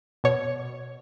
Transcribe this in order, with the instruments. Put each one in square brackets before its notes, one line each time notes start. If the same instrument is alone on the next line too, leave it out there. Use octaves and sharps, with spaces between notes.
[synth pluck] B2 C#5